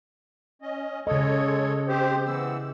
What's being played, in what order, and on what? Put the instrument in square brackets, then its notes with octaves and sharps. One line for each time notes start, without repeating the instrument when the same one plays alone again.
[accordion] C#4 D#5
[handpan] C#3 D#5 [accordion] G#3 A4 C#5
[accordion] C4 G4 C5
E3 B3 E6